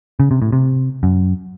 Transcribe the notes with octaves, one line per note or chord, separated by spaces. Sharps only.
C#3
C3
A2
C3
F#2